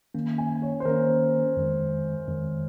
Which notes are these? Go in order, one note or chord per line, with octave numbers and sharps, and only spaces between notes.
D#3 A#3 C#4
G#5
C#5
C5
D#3 A#3 C#4 A#4
F2 D#3 G#3
F2 D#3 G#3